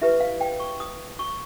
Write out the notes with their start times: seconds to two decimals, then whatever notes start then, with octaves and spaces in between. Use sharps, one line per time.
0.01 E4 G4 B4 E5
0.20 F5
0.41 G5
0.60 C#6
0.80 D#6
1.19 C#6